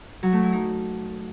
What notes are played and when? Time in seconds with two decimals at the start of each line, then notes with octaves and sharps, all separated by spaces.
0.23 F#3
0.33 A3
0.43 E4
0.53 D#4